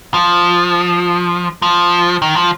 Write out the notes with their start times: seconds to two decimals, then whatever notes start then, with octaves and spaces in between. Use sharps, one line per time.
0.14 F3
1.62 F3
2.22 D#3
2.36 F3